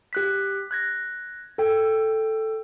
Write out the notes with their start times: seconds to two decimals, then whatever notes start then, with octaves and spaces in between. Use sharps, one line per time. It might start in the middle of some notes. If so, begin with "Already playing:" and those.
0.13 G4 F#6 B6
0.71 F#6 G#6 A#6
1.58 A4 G5